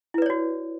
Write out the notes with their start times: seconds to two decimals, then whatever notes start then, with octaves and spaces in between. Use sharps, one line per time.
0.14 E4
0.18 B4
0.22 D5
0.26 C#5
0.30 F#4